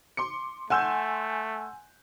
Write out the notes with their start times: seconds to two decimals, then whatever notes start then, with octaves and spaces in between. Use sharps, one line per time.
0.17 C6 D6 C#7
0.70 A3 F#5 G#5 C6 E6 G6 E7